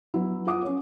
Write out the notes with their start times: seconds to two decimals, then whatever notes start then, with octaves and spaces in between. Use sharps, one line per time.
0.14 F#3 B3 E4
0.47 F4 F#5 D6 D#6
0.62 C#4 C#5